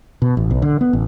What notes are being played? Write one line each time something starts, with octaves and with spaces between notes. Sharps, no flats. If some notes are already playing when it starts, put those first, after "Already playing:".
B2
A1
B1
D3
B3
A1